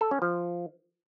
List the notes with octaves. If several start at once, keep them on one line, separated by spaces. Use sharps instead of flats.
A4
C#4
F3